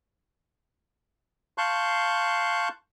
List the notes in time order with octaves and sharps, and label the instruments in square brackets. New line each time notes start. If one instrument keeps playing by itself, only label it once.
[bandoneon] F5 A5 C6 C#6 F#6 G6